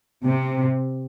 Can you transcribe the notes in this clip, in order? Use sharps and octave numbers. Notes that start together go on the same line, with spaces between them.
C3